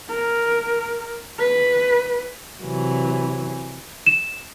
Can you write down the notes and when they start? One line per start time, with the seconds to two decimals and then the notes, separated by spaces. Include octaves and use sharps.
0.10 A#4
1.39 B4
2.62 C3 E3 F#3
4.06 E7